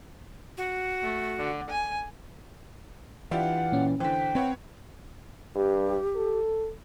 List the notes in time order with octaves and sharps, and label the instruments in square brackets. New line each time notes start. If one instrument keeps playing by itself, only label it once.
[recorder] F#4
[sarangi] A3
D3
G#5
[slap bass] E3 [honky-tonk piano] D4 F4 G4 [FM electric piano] E5 [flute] F#5
[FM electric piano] A#2 C#4
[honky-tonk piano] D3 E3 [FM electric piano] C5 B6 [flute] G5
[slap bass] C4 [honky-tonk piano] B4 C#5 F#5
[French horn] G2 [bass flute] G4
[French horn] A4